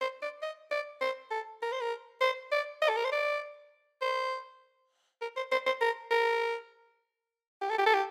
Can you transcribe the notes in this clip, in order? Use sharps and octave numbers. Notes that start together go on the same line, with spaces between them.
C5
D5
D#5
D5
C5
A4
A#4
C5
A#4
C5
D5
D#5
A4
A#4
C5
D5
C5
A#4
C5
C5
C5
A#4
A#4
G4
A4
G4
A4
G4